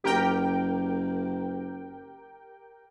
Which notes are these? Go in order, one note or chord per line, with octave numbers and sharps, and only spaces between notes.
F#1 G4 A#4 G5